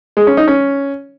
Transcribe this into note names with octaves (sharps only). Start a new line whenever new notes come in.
G#3
C#4
D#4
C#4